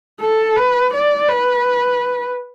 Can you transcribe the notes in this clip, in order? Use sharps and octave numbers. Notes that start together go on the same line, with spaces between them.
A4
B4
D5
B4